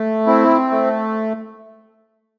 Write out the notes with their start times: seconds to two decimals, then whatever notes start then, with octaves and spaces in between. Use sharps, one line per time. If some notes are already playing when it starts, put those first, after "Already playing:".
Already playing: A3
0.27 C4 E4
0.71 A3